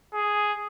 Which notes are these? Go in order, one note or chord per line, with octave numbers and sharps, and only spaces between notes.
G#4